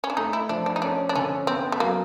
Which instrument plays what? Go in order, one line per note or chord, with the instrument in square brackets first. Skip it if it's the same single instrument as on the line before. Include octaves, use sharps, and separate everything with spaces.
[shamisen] C#4
D4
[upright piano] A3 [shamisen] D#4
[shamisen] E4
[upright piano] F3 [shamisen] D4
[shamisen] D4
D#4
[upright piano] C#4 [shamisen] D4
[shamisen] D4
[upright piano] D3 [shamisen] C#4
[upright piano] B3 [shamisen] C4
[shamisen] A3
[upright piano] F#3 [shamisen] A#3